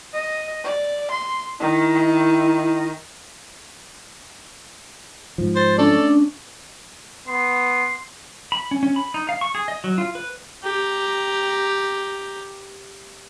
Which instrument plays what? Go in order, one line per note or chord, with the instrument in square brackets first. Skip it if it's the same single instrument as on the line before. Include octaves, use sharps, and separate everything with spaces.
[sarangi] D#5
D5
C6
[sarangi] D#3 [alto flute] E4
[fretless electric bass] G#2 F3
[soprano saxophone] C5 [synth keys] A6
[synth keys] A3 C#4 D4 [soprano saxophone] A4 [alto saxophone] D5
[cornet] B3 [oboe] C6
[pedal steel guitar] B5
C#4
C#4
B5
D#4
F5
C#6
G#4
D#5
F#3
F4
B4
[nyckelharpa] G4 A#5